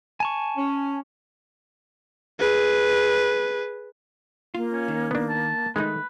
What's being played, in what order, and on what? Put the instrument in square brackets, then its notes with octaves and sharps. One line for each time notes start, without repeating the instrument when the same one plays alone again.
[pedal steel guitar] G#5 A5 C#6
[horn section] C#4
[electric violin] G#4 B4
[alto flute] A#3 [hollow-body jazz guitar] F4
[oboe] C#4
[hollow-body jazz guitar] D#3
[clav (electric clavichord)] B3 D4
[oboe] A5
[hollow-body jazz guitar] D#3 A3 [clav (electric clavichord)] G#3 D#4 [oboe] B4